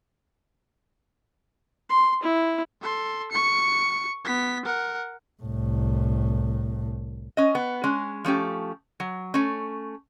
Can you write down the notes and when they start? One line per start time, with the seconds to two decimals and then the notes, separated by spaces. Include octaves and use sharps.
1.90 C6
2.23 E4
2.81 A4 C6
3.32 C#6 C#7
4.25 B3 B6
4.65 A#4 F#5
5.42 C2 A2
7.37 C#4 D#5
7.55 B3
7.84 G#3 C#4
8.24 F3 A3 C#4 G4
9.00 F#3
9.34 A3 C#4